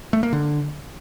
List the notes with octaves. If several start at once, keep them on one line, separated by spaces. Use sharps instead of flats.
A3
A#3
D3